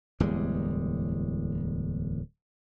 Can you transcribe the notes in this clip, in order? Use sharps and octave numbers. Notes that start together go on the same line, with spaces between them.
D1 E2 G3 G#3